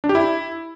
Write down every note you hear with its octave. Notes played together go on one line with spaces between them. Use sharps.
D4
G4
E4